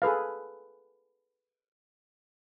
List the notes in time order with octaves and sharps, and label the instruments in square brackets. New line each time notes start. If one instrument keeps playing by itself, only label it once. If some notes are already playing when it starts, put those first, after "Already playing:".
[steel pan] G#4 A4 B4 F5